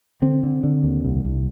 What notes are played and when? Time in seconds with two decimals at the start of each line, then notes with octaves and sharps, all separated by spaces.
0.22 D3 C4
0.43 D3
0.63 D3
0.83 D#2
1.04 C2
1.25 C2